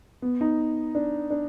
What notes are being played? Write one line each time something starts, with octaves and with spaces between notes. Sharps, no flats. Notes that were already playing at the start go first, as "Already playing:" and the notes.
B3
D#4
D4
D4